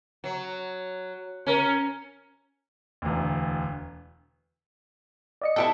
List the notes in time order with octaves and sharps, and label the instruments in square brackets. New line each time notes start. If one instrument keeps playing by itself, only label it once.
[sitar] F#3
C#4 A#4
[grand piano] E1 D2
[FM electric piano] D5 D#5 C#7
[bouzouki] E4 G4 A4